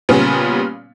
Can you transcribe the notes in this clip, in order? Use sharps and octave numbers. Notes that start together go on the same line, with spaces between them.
A#2 C#3 G3 B3 C#4